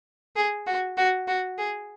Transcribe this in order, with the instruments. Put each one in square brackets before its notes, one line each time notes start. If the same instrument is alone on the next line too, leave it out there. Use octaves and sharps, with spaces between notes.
[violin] G#4
F#4
F#4
F#4
G#4